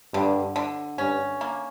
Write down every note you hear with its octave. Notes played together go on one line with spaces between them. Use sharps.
G2 D3
D3
G2 C#4
A#3